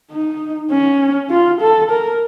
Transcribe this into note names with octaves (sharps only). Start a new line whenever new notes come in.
D#4
C#4
F4
A4
A#4